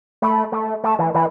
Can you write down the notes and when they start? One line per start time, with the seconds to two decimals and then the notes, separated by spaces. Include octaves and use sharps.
0.22 A3 B5
0.52 A3
0.84 A3 A5
0.99 E3
1.14 E3 B5